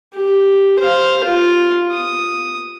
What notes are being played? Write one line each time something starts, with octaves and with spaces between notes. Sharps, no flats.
G4
C5 F5
F4
D#6